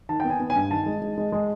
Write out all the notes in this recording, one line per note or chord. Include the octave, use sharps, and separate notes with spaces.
D#3 A5
B3 G5
G#5
B3
G#5
G2
D#3 A5
G#3
G#3
G#3
G#3